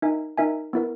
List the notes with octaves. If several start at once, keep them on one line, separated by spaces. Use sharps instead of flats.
D#4 A#4 E5 G#5
D#4 A#4 E5 G#5
B3 E4 A#4